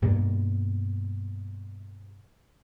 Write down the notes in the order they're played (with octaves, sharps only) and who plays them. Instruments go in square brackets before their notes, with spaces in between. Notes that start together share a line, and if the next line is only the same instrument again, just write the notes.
[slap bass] G2 B2 G3 A#3